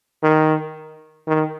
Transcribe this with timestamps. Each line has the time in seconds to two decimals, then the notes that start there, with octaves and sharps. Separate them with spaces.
0.23 D#3
1.27 D#3